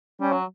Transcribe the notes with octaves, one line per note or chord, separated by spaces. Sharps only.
G3 C#4
F#3